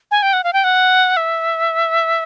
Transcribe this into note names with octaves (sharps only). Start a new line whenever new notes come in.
G#5
G5
F#5
F5
G5
F#5
E5